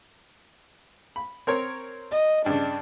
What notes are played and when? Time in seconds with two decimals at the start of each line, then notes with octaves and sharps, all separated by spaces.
1.16 B5
1.47 C4 A#4 C#5
2.11 D#5
2.46 G2 C#3 D4